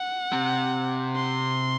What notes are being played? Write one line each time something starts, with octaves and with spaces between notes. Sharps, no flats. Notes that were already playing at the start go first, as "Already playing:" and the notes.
Already playing: F#5
C3
C6